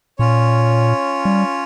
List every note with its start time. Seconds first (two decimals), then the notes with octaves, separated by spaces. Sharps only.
0.19 A#2 C#4 F4 C#5
1.25 G3